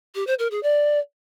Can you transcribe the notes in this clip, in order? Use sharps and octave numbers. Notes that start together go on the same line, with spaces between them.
G4
C5
A#4
G#4
D5